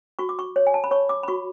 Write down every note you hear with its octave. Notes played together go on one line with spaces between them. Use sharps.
F#4 C#6
D6
C#6
C#5
G#5
A5
B5
C#5 C#6
D6
B5
F#4 C#6